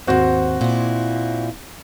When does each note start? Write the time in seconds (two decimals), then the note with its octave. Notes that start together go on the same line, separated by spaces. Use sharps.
0.07 D#2 G#2 C4 F#4
0.61 A#2 E4